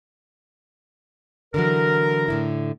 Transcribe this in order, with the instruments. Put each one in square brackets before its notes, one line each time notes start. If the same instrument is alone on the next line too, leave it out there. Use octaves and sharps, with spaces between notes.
[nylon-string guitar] D3 E3 F#3 [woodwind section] A#4
[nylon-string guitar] A2 D3 E4